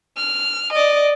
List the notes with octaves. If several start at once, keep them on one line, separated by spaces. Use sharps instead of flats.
F6
D5 D#5